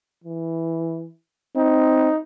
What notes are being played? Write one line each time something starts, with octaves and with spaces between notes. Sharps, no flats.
E3
C4 D#4